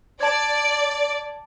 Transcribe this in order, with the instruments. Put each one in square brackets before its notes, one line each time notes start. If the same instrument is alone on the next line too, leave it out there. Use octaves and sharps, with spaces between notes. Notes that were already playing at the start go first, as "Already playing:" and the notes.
[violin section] D5 [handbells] A5 G#6